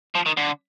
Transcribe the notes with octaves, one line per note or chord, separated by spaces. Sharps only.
F3
D#3
D3